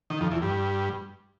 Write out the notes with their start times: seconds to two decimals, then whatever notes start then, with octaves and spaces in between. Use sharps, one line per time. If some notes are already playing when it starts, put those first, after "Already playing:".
0.10 D#3
0.21 F2
0.31 E2
0.42 G2